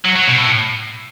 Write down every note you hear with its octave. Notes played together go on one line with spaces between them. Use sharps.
F#3
F#3
B2
A2